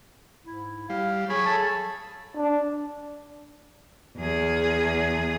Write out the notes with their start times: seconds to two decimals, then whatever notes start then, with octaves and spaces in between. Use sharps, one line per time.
0.46 G#2 E4
0.90 G3 F5
1.30 F#3 G#4 C#5 B5
1.46 A4 A5
2.37 D4
4.17 E2 G#4